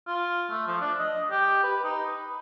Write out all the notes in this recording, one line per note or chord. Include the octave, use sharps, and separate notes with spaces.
F4
A3
F3
D4
D#5
G4
B4
D#4
B4